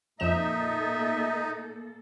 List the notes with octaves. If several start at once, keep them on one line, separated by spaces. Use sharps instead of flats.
F2 A#2 F3 A#3 D#4 A4 E5 E7